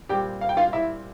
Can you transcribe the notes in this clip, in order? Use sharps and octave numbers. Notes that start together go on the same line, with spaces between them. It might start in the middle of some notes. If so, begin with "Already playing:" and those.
A#2 G3 C4 G4 G5
F5
G5
F4 F5
E4 E5